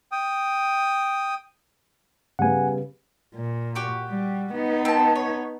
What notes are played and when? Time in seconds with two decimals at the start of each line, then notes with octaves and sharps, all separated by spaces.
0.12 G5 D#6
2.39 C#3 G3 B3 F#5 G#5
3.35 A#2
3.75 F#4 G4
4.09 G3
4.53 B3 D#4
4.85 C4 A5
5.16 C#5